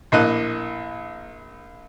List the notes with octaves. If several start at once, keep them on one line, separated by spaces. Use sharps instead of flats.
A#1 A2 A#3 D#5 F#6